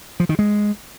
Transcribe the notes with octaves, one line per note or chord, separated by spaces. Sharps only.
F3
D#3
G#3